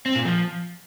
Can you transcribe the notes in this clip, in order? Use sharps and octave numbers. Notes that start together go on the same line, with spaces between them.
C4
A#2
F3